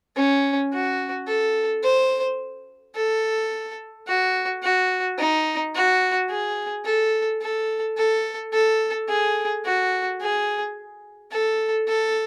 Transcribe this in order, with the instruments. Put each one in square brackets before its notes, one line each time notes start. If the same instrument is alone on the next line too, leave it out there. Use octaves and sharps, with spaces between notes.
[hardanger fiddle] C#4
F#4
A4
C5
A4
F#4
F#4
D#4
F#4
G#4
A4
A4
A4
A4
G#4
F#4
G#4
A4
A4